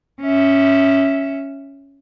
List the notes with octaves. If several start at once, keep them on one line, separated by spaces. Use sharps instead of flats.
C#4 E5